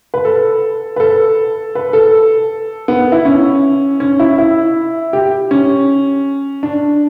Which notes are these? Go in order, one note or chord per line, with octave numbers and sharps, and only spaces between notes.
B4
A4
B4
A4
B4
A4
B3
E4
C#4
C#4
E4
E4
G4
C#4
D4